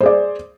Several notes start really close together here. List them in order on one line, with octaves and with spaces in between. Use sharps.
C5 G#4 D5